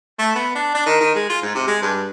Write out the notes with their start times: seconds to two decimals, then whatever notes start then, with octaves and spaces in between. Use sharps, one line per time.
0.19 A3
0.35 B3
0.55 D4
0.74 D4
0.86 D#3
1.00 D#3
1.15 G#3
1.29 F4
1.42 G#2
1.55 C3
1.67 G#3
1.82 G2